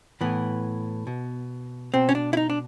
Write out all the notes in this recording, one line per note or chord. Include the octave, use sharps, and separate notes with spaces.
A2 E3 B3
B2
B2 C4
C#4
D4
E4
D#4
D4